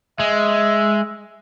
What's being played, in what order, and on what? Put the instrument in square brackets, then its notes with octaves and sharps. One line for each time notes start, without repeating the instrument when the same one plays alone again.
[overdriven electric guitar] G#3 [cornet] E5